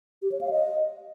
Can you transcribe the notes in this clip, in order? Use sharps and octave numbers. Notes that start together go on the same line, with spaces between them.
G4
C#5
F5
D#5